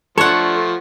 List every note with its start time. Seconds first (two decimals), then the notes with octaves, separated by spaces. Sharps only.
0.18 F3 A3 D4 F4 A4 C#5 F#5